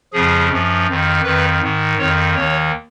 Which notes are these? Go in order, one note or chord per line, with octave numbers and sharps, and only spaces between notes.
F2 C#3 F3 G#4
F#2 F3
F2 D#3
F2 D#3 B4
G#2 D#3
F2 D#3 C#5
D#2 D#3 C#5